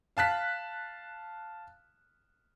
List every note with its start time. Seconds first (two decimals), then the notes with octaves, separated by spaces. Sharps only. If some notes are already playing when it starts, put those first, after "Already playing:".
0.17 F5 A5 F#6 B6